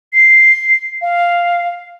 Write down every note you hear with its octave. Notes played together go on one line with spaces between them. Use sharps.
C7
F5